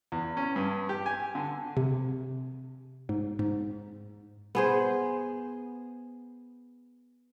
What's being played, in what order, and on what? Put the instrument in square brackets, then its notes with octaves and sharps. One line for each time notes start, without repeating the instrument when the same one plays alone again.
[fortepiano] E2
C#4
G2
G4
G#5
D3
[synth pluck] C3
G#2
G#2
[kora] B3 G#4 C5